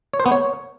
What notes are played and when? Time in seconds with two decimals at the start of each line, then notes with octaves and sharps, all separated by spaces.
0.14 C#5
0.20 C5
0.26 B3
0.32 C#5